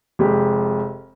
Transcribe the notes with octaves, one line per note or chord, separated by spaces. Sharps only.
F1 G#3 G4